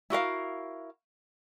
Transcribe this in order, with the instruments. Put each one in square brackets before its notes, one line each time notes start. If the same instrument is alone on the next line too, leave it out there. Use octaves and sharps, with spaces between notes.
[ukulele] E4 F#4 A#4 F5